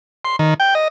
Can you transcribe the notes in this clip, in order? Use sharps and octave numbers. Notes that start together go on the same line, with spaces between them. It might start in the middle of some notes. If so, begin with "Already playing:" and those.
C6
D#3
G5
D#5